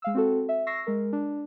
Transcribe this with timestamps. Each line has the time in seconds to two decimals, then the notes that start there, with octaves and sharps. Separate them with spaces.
0.02 G#3 F5 E6
0.15 C4 F#4 A4
0.49 E5
0.67 C#6 E6 A#6 C7
0.87 G#3 A#4
1.13 D4